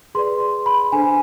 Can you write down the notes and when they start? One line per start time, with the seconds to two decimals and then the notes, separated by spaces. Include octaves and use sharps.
0.15 G#4 B4 D5 C6
0.40 C6
0.66 B5
0.92 D4 A4 C5 G#5